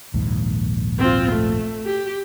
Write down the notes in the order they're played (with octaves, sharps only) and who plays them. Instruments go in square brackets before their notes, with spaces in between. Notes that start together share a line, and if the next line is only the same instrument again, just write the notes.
[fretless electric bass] A#1 D#2 G#2
[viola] C4 F4
A3
G4